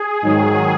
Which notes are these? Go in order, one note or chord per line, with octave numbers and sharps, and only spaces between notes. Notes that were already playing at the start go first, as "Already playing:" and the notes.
Already playing: G#4
G#2 D#3 F#3